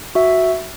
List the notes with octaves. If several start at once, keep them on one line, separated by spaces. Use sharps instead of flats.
F#4 E5